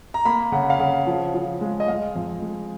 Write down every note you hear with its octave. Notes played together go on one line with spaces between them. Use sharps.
A#5
A#3 B5
C#3 F#5
F5
C#3 F#5
F3
F3
G#3
D#5
G#3 F5
F2
G#3